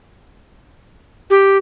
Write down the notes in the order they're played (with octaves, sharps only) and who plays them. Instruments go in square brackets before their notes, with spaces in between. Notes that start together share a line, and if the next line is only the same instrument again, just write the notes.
[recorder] G4